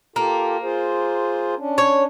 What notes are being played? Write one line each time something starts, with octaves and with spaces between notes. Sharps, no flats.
A#3 F4 G4 A4
F4 G#4 C5
C#4 D4
C#5